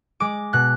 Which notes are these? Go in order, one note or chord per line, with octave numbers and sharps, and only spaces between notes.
G#3 D6
B2 F#6